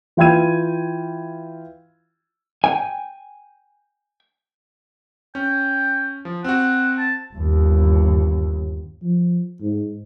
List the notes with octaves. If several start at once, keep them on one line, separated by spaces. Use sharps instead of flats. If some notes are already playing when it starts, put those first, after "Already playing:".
E3 F4 G5 B5 G#6 D#7
G5 G#5
C#4 G5
F3
C4 F#4 F#5
A5
G1 D#2
F3
G#2